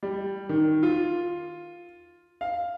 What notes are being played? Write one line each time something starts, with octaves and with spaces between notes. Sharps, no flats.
G3
D#3
F4
F5